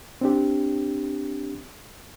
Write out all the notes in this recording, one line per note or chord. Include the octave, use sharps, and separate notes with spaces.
C4 D4 G4